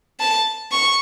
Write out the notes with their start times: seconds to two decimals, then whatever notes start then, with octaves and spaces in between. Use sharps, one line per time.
0.20 A5
0.72 C#6